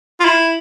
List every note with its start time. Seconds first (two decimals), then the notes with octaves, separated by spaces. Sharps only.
0.20 F4
0.25 E4